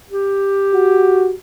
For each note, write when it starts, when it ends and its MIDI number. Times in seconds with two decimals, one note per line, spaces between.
0.11 1.33 67
0.74 1.34 66